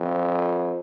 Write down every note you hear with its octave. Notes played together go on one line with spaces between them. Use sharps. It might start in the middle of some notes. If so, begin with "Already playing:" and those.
Already playing: F2